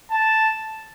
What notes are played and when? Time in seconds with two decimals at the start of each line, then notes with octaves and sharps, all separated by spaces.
0.11 A5